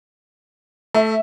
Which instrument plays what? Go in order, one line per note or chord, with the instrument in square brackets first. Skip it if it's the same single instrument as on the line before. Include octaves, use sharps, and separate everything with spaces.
[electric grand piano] A3 [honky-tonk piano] E5